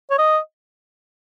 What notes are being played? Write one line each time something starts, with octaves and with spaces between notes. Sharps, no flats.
C#5
D#5